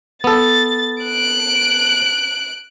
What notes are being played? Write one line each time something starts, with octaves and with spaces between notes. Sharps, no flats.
B3 A4 A6
F#6 D7